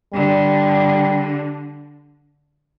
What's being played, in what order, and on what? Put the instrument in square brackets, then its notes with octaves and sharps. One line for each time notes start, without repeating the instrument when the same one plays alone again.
[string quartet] D3 [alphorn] G3